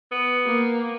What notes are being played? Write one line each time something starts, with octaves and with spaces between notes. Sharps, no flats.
B3
A#3